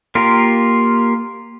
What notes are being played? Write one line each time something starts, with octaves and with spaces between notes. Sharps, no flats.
A#3 F4 G4 A#4